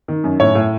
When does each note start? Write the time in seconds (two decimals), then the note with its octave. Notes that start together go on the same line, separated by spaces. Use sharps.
0.08 D#3
0.24 F#2
0.40 A2 C#5
0.55 A2